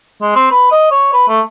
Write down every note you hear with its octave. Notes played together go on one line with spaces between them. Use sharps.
G#3
C4
B4
D#5
C#5
B4
A3